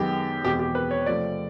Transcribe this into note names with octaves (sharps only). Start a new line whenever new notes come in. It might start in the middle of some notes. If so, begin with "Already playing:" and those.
Already playing: F#2 D#3 G#3 B3 G4
E2 B2 G#3 C4 G4
G4
B4
C#5
C3 F3 A3 D5